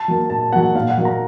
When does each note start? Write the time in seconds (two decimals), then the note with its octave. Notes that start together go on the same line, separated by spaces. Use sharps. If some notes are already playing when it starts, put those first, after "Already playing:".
Already playing: A5
0.08 F#3 A#3
0.30 A#2 A5
0.53 F#3 A#3 F#5
0.75 A#2 F5
0.90 F#5
0.97 F#3 A#3
1.05 A#5